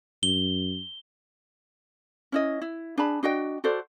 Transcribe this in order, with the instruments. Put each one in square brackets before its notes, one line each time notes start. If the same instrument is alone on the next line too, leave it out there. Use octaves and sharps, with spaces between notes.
[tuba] F#2 [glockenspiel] G7
[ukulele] C#4 E4 D#5
E4
D4 G#4 A5 B5
D4 F#4 D#5 G5
F#4 A4 C5 D5